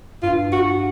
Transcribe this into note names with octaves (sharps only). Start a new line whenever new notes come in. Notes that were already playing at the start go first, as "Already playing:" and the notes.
G2 F4
F#4